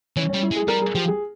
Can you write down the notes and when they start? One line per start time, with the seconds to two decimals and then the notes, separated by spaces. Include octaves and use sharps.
0.17 E3 C#4
0.29 G3 C#4
0.43 E4
0.51 G#3
0.56 G#4
0.68 G3 A#4
0.82 G#4
0.94 F3 G4
1.08 G#4